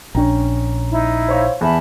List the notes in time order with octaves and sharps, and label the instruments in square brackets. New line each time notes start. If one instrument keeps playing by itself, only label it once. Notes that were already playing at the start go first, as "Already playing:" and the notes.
[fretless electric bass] A#1 D4 [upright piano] C#4 G5 A#5
[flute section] D#4 E4
[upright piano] C5 C#5 F5
[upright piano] E2 [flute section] E5 A5 B5